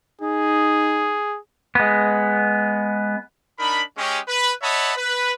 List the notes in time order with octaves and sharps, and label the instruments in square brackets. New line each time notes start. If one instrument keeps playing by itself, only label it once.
[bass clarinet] D#4 [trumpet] G#4
[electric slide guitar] G#3 B3
[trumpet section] D4 D#4 A#4 B5
G#3 C#4 G4
B4
C#5 D#5 E5 F#5 A5 B5
B4